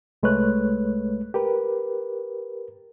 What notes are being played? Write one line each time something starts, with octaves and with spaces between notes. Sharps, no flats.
C2 G#3 A3 B4 C#5 F#6
G4 A#4 B4